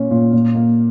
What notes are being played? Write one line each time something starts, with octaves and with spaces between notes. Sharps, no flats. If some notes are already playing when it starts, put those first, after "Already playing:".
Already playing: A#2 A#3 C#4
A#2
A#2
A#3